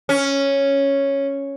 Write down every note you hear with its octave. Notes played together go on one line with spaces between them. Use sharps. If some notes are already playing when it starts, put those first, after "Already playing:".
C#4